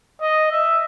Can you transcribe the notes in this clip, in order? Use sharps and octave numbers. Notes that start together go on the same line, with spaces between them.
D#5
E5